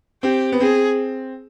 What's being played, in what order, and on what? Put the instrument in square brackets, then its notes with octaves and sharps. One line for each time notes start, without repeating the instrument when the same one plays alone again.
[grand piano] C4 [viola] G4
[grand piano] B3
[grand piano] C4 [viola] G#4